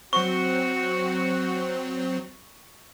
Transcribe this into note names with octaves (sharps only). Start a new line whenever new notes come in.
F#3 C4 F#4 C#6